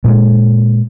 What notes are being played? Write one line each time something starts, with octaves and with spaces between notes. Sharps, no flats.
A#2 G#3